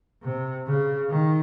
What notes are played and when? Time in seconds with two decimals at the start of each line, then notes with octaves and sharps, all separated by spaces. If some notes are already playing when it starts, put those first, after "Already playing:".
0.23 C3
0.66 C#3
1.10 D#3